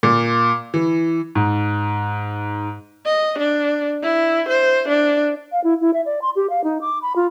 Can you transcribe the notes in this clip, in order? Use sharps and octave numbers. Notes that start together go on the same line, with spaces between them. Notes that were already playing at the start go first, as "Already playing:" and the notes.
A#2
E3
G#2
D#5
D4
E4
C5
D4
F5
E4
E4
E5
D5
C6
G4
F5
D#4
D6
B5
F4